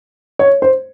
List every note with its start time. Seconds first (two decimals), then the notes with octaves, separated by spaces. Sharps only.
0.39 C#5
0.62 C5